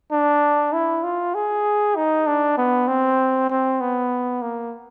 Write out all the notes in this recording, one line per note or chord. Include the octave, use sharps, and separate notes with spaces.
D4
E4
F4
G#4
D#4
D4
B3
C4
C4
B3
A#3